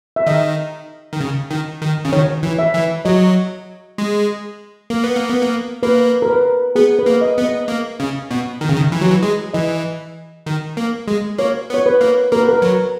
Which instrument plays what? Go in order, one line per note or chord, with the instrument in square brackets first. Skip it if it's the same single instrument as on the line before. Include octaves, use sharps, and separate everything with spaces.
[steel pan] E5
[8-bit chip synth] D#3 [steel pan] D#5
[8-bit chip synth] D#3
C#3
D#3
D#3
C#3
[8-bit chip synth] D#3 [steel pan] C#5
[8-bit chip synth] E3
[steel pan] E5
[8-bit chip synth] E3
[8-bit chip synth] F#3 [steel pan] D#5
[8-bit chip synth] G#3
A#3
B3
A#3
B3
A#3
[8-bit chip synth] A#3 [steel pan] B4
[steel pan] A#4
B4
[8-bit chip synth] B3 [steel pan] G#4
[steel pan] B4
[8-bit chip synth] A#3
[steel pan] D#5
[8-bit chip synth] B3
[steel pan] D#5
[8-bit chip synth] A#3
C#3
B2
D#3
C#3
D#3
E3
F#3
E3
G#3
[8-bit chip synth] E3 [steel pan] D#5
[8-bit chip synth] D#3
A#3
G#3
[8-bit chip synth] A#3 [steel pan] C#5
[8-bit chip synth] B3 [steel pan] C#5
[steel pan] B4
[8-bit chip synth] A#3
[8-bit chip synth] A#3 [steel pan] A#4
[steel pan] B4
A#4
[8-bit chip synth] F#3